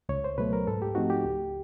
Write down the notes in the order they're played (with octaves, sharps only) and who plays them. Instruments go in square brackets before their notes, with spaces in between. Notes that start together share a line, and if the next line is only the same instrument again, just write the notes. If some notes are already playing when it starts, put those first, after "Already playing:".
[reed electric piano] C#2 C#5
C5
B2 F#3 A3 B4
A#4
G#2 A4
G4
F3 A3 C4 D#4 F#4
G4
C#2